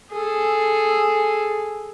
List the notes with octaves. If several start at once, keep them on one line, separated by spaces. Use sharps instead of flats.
G#4 A4